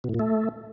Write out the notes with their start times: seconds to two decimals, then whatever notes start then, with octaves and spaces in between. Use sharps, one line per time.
0.04 B2
0.09 A2
0.14 A#2
0.19 A3